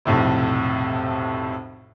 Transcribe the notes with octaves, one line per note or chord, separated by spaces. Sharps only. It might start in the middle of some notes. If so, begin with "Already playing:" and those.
B1 F2 A2 C3